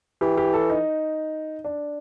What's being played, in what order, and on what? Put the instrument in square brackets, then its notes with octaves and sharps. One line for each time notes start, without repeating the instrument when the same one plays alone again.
[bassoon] E3 [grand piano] G4
[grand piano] G4
A4
D#4
D4